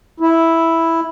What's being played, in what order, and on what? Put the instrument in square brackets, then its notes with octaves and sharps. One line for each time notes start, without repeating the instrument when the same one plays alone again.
[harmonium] E4